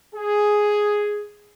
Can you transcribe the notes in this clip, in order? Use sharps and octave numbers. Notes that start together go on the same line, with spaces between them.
G#4